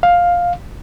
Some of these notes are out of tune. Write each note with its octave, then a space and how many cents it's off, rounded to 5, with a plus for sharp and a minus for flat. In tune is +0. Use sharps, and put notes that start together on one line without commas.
F5 +10